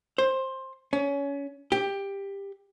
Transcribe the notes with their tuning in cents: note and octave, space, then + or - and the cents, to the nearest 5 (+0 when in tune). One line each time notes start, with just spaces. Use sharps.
C5 +15
C#4 +25
G4 +15